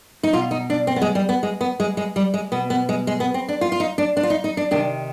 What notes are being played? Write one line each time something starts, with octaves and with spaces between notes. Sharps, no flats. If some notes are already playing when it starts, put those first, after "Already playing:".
D#4
B2 F4
D#4
D4
C4
B3
G#3
G3
B3
G#3
B3
G#3
G#3
G3
G#3
B2 B3
B3
G#3
G#3
B3
C4
D4
F4
F4
D#4
D4
D4
F4
D#4
D#4
D4
C3 D#3 D4